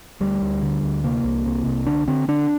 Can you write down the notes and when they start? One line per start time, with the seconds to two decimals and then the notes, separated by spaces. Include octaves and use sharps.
0.20 D2 G3
0.41 D2
0.62 D3
0.83 D2
1.04 C3 A#3
1.25 C2
1.46 C3
1.66 C2
1.87 D3 D4
2.08 D3 C4
2.28 D3 D4